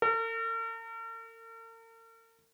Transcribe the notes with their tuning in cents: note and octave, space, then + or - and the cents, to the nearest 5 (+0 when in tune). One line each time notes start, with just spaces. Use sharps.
A#4 -45